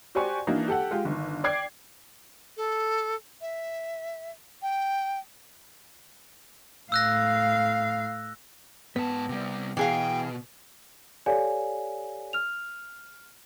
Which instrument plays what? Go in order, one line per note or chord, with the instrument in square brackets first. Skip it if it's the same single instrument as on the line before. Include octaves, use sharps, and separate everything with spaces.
[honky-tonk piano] F#4 G4 C5 D5 G#5 C#6
E3 A#3 D4 D#4 F#4
G4 A4 F#5
G#3 F4 G4
G1 D#3
D5 G5 D6 G#6 C7
[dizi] A4
E5
G5
[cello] A2 F5 [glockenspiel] E6 F#6 A#6
[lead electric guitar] G#2 A5 [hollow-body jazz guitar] B3
[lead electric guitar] C3 G3
[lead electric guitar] B2 [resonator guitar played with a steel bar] E3 G#4 F5 [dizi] G5
[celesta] G4 A4 C#5 D5 F5 G#5
F6 F7